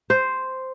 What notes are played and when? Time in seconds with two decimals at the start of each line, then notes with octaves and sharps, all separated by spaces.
0.10 C5